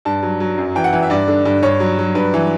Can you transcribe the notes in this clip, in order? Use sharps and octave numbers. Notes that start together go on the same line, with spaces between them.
G2 A5
F#3
F#3
F#2
E3 G5
F#5
E3
E5
G2 D5
D3
G2
G2 C#5
F#3
F#3
G2 B4
E3